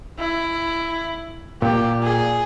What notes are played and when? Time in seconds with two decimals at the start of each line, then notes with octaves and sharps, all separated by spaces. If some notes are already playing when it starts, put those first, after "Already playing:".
0.19 E4
1.62 A#2 G4
2.02 G#4